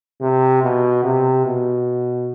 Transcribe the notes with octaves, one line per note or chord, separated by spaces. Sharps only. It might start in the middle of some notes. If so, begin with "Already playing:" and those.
C3
B2
C3
B2